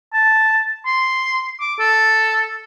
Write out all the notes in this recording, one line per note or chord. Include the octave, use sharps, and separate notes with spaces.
A5
C6
D6
A4